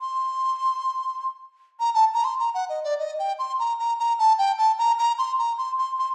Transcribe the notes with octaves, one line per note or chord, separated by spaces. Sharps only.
C6
A#5
A5
A#5
C6
A#5
F#5
D#5
D5
D#5
G5
C6
A#5
A#5
A#5
A5
G5
A5
A#5
A#5
C6
A#5
C6
C6
C6